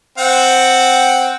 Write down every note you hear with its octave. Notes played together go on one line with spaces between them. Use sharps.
C4 F#5 G5